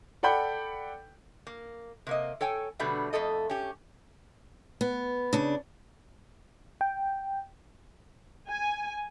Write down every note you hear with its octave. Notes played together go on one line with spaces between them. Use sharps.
A4 D5 F#5 G5 B5 G6
A#3
C3 A#3 D#5
A4 C#5 G5 G#5
B2 D3 G3 A3 B3
F2 A3 A4 D#5
C#4 G4
B3
C#3 D4
G5
G#5